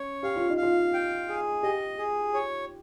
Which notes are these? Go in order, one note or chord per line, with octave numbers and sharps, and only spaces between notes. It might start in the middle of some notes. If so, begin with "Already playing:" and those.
Already playing: C#4 C#5
G4 F5
F4
D#4
F5
F4
G5
G#4
G4 D#5
G#4
C#5